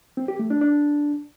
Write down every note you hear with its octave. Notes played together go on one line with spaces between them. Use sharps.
C4
G4
A3
D4
D4